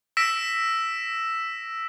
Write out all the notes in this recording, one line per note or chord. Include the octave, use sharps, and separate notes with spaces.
E6 A#6 B6 D7 E7